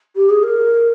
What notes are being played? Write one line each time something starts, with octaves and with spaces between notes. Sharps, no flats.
G4
G#4
A#4